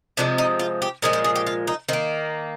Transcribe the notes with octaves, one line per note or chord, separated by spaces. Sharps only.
C3 F3 G#3 D4
D#4
F4
G4
A#2 F3 G#3 G#4
C5
G#4
G4
F4
D#4
D#3 A#3 C4